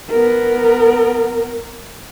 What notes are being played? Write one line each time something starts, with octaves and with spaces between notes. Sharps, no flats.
B3 A#4